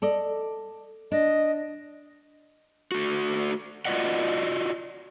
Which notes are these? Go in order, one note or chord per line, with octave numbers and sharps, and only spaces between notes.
A4 D5 D#5
D4 D#5
A3 F#4
F4 F#4 A#4 D5 D#5 F#5